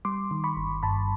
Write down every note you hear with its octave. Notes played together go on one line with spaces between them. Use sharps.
G3 C6 D6
D#3
B5 C#6
G1
G2 A5 B5